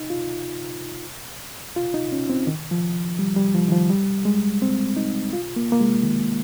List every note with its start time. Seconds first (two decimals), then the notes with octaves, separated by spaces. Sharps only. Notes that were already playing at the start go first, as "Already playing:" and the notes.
Already playing: D#4
0.10 F4
1.76 F4
1.94 D#4
2.12 C#4
2.30 C4
2.47 D#3
2.71 F3
3.19 G3
3.36 G3
3.55 F3
3.68 D#3
3.72 F3
3.90 G3
4.25 G#3
4.62 C4
4.97 D#4
5.33 F4
5.56 A#3
5.72 A#3
5.81 G#3
6.03 D#3